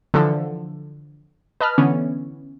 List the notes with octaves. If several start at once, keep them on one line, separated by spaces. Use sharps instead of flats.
D3 E3 F3 A4
B4 D#5 A5 B5 F6
D3 E3 B3 C#4